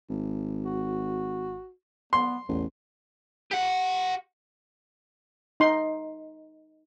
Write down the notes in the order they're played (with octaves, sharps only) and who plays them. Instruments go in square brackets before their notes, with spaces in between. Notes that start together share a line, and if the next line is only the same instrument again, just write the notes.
[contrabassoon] G#1
[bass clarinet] F#4
[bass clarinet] B3 [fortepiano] C6
[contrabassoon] A1 [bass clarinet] E2
[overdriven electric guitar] G4 F#5
[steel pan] D#4 C6